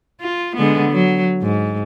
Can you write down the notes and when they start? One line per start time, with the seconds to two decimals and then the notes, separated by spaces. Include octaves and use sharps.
0.21 F4
0.57 D3 G#3 B3
0.91 F#3
1.41 G#2